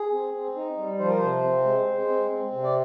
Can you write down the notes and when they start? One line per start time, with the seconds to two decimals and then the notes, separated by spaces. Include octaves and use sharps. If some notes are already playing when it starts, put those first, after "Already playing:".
Already playing: G#4
0.12 C4
0.34 C4
0.56 D#4
0.77 G3
0.99 F3 C5
1.09 A#4
1.18 C3 C5
1.43 C4
1.64 G#3
1.87 G#3
2.08 C4
2.30 C4
2.52 C3
2.63 D5